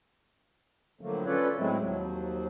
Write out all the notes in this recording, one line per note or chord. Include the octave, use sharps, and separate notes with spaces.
A2 D3 F3 F#3 A3 A#3
C#4 F4 A4 B4 C#5 D5
A2 F#3 G#3 A3 C4 E4
D#2 F3 F#3